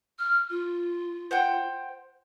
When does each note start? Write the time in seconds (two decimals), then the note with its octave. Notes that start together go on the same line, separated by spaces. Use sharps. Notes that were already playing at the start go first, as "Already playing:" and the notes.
0.19 F6
0.49 F4
1.31 C5 F#5 G5